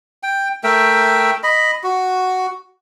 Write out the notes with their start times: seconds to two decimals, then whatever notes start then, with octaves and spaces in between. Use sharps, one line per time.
0.23 G5
0.64 A3 A#4 E5 G5
1.43 D#5 B5
1.83 F#4